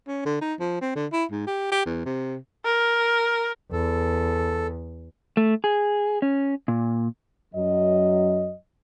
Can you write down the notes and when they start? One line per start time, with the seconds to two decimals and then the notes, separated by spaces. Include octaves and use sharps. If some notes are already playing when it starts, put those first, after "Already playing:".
0.07 C#4
0.26 D3
0.41 D#4
0.60 F3
0.81 C4
0.96 D3
1.12 E4
1.32 G#2
1.47 G4
1.72 G4
1.86 E2
2.06 C3
2.65 A#4
3.72 E2 A4
5.37 A3
5.64 G#4
6.22 C#4
6.68 A#2
7.54 F#2 F#3 D#5